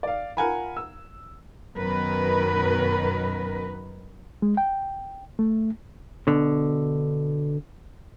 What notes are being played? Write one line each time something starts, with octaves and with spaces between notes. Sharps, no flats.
D5 F5
F4 A#4 F#5 G#5 A#5 B5
E6
F#2 B2 D#3 A#4 B4
G#3
G5
A3
B2 D3